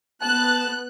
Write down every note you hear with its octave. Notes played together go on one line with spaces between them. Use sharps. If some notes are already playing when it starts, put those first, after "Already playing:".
B3 A5 F#6